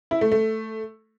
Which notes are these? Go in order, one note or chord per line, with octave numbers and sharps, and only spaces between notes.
E4
A3
A3